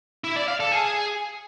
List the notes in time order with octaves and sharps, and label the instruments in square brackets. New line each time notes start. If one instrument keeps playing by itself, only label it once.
[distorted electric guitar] E4
D5
F5
A4
G#4